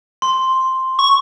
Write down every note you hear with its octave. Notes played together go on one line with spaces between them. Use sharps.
C6
C#6